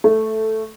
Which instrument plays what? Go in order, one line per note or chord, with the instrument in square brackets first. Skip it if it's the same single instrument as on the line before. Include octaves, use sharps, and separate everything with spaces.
[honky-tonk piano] A3